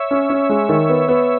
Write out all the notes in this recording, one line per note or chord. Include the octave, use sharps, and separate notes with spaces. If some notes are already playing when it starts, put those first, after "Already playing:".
Already playing: C#5 E5
C#4
C#4
G#3
D#3
B3
B3